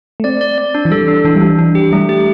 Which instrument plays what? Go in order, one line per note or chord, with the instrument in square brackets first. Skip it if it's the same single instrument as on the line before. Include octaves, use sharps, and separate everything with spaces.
[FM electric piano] A3
[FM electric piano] C4 [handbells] D5
[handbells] D5
D5
D4
[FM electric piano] E3
[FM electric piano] G3 [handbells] A4
[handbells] D4
[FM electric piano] E3 [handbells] D4
[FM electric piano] G3
[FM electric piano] E3 [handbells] D4
[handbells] D4
G4
[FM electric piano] G3 [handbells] A3
[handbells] G4